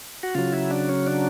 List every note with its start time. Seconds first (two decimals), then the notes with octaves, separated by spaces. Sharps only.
0.23 F#4
0.35 C#3 F#3 F4
0.53 E4
0.71 D4
0.89 C#4
1.07 D4